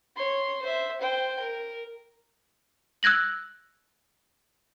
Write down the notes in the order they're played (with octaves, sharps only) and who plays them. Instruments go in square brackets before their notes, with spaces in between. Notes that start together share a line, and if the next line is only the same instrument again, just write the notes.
[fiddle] C#5 C6
C5 E5
C5 G5
A#4
[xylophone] E6 F#6 G#6 A#6 F#7